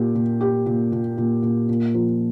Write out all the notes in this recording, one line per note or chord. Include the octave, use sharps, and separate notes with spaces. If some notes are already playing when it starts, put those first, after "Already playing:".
Already playing: A#2 G4
A#2
G4
A#2
A#2
A#2
A#2
A#2
F3